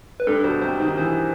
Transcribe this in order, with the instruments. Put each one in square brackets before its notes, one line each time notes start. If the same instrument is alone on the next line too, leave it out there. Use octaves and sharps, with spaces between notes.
[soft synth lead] B4
[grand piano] G2 [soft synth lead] A4
[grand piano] B2 [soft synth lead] C5
[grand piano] C3 [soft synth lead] C5
[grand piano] D#3 [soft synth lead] C5
[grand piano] E3 [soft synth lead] C5